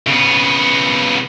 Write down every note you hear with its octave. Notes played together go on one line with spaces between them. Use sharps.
C#3 B3